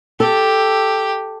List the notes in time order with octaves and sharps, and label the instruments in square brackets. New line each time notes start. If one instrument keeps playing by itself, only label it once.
[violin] G4 [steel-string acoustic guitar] A4